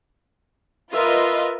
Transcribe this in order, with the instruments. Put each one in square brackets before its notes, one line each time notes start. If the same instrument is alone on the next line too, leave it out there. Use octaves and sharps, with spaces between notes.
[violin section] F4 B4 D#5 [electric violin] A#4 E5